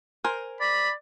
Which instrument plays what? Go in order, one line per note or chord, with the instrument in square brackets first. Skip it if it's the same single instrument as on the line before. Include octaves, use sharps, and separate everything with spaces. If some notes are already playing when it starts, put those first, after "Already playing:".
[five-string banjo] A#4 C5 G#5
[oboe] D5 [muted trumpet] B5